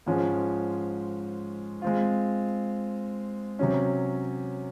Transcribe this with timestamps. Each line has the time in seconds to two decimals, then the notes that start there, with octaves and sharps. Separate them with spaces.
0.06 G#2 F3 G#3 C#4
1.82 G#3 C4 F4
3.59 C3 F#3 C#4